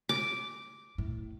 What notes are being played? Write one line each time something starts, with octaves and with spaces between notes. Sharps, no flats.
D6
A2